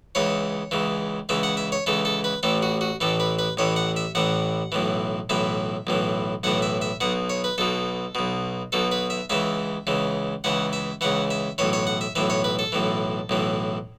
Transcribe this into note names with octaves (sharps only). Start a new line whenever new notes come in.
C#2 C#3 E3 C#5
C#2 C#3 E3
C#2 C#3 E3 E5
F#5
E5
C#5
C#2 C#3 E3 A4
A4
B4
A1 A2 E3 A4
F#4
F#4
A1 A2 E3 A4
B4
B4
A1 A2 E3 C#5
F#5
E5
A1 A2 E3 F#5
B1 A2 E3
B1 A2 E3 E5
B1 A2 E3
B1 A2 E3 F#5
E5
E5
B1 B2 F#5
C#5
B4
B1 B2 A4
B1 B2
B1 B2 A4
B4
E5
C#2 C#3 E3 E5
C#2 C#3 E3
C#2 C#3 E3 F#5
E5
C#2 C#3 E3 F#5
E5
B1 A2 E3 C#5
C#5
F#5
E5
B1 A2 E3 E5
C#5
B4
A4
B1 A2 E3
B1 A2 E3